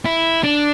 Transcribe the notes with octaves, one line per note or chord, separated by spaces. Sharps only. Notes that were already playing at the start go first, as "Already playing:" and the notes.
E4
D4